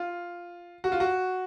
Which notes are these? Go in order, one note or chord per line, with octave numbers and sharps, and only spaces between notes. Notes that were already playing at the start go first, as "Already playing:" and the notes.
Already playing: F4
F#4
F4
F#4